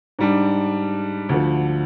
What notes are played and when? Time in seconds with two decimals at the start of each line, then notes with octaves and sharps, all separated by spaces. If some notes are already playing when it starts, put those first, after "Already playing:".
0.19 G#2 G3 D4
1.29 D2 D3 F3